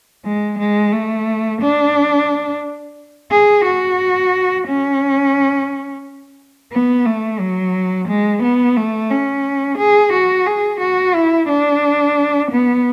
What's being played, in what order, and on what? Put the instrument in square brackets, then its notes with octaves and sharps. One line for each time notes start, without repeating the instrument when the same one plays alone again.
[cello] G#3
G#3
A3
D4
G#4
F#4
C#4
B3
A3
F#3
G#3
B3
A3
C#4
G#4
F#4
G#4
F#4
E4
D4
B3